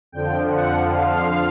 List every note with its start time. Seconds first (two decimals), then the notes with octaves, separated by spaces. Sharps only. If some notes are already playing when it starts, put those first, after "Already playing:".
0.12 F2 D3 F3 G5
0.48 F#5
0.85 F5